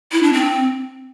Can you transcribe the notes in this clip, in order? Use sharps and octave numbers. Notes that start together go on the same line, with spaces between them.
E4
D4
C4